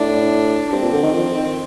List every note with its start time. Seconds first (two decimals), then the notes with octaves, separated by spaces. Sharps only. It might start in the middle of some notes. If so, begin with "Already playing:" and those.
Already playing: A2 D4
0.71 G2 C4
0.82 A#2
0.92 D3
1.02 D#3
1.14 F3
1.34 D#3